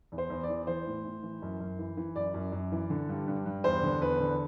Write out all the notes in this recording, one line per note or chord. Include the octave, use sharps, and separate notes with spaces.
E2
C5
E2
D5
E3
E3 C5
A2
A2
E3
F#2
F#2
E3
E3
F#2 D5
F#2
F#2
E3
D3
G2
G2
G2
E2 C5
D3
E2 B4
D3